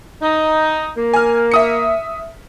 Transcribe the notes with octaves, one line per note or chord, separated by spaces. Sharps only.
D#4
A#3
G#5 F6
E5 D#6 C#7